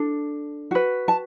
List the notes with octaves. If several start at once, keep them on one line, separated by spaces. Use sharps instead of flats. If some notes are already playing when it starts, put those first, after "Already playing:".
Already playing: D4 A4
F#4 B4
A5